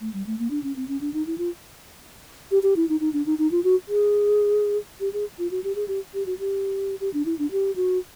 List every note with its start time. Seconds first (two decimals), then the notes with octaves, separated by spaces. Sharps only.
0.01 A3
0.14 G3
0.26 A3
0.39 A#3
0.50 D4
0.63 C#4
0.76 C4
0.88 C#4
1.01 D4
1.14 D#4
1.27 E4
1.38 F4
2.51 G4
2.63 G4
2.76 E4
2.89 D#4
3.00 D#4
3.13 D4
3.26 D#4
3.38 D#4
3.51 F4
3.64 F#4
3.88 G#4
5.00 G4
5.13 G#4
5.39 F4
5.51 F#4
5.64 G4
5.75 G#4
5.88 G4
6.14 G4
6.26 F#4
6.39 G4
7.00 G4
7.13 D4
7.26 E4
7.39 D4
7.52 G4
7.76 F#4